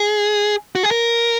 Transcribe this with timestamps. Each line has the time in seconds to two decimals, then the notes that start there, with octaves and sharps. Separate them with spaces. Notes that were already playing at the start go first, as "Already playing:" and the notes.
Already playing: G#4
0.75 F#4
0.83 G#4
0.91 A#4